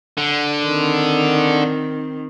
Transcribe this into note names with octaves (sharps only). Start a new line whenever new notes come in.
D3
D#3 C4